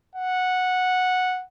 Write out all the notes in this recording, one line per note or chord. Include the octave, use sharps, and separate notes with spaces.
F#5